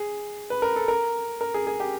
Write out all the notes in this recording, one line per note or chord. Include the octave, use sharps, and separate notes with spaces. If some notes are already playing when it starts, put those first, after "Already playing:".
Already playing: G#4
B4
A#4
A4
A#4
A#4
G#4
G#4
G4